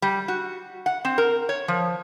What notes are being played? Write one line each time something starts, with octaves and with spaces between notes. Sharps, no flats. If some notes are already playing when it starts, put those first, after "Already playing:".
G3
F#4
F#5
C4
A#4
C#5
F3